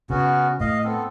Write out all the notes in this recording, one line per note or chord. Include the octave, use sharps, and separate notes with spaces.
C#3 B3 C#4 F#4
A2 D#5 F5
B3 C4 A4